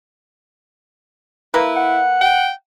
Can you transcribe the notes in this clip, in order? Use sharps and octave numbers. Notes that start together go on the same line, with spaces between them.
A#3 E4 B4
F#5
G5